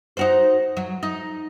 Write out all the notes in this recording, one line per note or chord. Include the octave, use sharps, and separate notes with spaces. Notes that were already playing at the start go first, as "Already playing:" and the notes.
D#4 F#4 C5
F#3
D#4